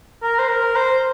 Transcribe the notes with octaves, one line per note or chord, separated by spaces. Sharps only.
A#4
C5
A#4
C5